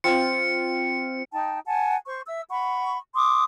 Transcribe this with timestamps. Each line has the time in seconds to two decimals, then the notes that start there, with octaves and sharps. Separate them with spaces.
0.04 C4 F4 C#7
1.33 D#4 G5 A5
1.66 F#5 G#5 A5
2.06 C5 C#6
2.27 E5 E6
2.49 F#5 B5 C#6
3.15 C6 D6 D#6